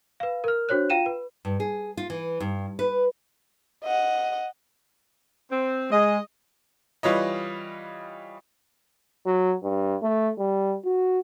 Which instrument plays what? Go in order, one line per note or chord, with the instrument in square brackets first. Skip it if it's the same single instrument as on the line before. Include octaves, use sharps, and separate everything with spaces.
[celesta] B4 F5
A#4 F6
D4 F#4 C5 C#5 F#6
F4 F5 G5 D#7 E7
B4
[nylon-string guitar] G2
G#4
F4
E3
G2
B4
[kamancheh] D#5 F#5
[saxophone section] C4
[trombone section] G#3 [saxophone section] D#5
[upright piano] E3 G3 F4 B4 C#5 D#5
[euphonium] F#3
G2
A3
G3
F#4